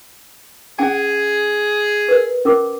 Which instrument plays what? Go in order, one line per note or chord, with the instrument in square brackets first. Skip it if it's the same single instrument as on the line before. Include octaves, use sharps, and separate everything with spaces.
[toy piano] C#4 F#5 G#5 [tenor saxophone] G#4
[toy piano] A#4 B4
C#4 A#4 D6